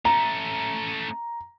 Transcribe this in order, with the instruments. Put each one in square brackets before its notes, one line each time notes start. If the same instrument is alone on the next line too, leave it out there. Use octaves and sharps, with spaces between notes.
[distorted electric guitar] A3 C#4 [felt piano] A#5